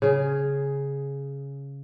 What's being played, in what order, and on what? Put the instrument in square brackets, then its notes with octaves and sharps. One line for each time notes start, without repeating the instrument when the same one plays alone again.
[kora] C#3 G#4